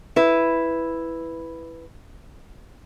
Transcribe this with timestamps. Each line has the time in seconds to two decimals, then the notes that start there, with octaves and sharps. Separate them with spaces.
0.16 E4 B4